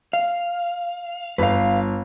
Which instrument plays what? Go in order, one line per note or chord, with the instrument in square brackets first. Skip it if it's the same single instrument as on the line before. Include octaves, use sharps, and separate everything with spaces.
[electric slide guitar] F5
[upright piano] G1 [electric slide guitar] B4 F5